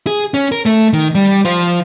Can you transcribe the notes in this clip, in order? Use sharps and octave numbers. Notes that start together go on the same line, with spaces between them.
G#4
C#4
A#4
A3
D#3
G3
F3